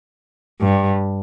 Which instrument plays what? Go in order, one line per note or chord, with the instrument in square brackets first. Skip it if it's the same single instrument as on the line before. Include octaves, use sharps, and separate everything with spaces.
[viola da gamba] G2